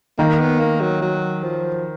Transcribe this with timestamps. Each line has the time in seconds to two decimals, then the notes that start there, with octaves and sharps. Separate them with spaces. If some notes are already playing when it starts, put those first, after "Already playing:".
0.18 D#3 A#3
0.39 B3
0.60 A#3
0.81 F#3
1.02 F#3
1.43 F3